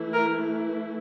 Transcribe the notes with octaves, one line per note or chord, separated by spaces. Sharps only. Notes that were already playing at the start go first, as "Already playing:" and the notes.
Already playing: E3 A3 E4
A#4